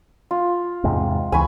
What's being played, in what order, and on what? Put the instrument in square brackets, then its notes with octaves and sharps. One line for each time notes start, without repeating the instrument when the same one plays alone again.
[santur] F4
[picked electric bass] E2 G#2 C3
[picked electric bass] C#2 E3 [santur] G#5 B5 C#6